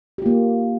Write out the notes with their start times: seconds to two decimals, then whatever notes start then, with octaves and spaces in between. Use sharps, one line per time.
0.18 G4
0.22 F4
0.26 A#3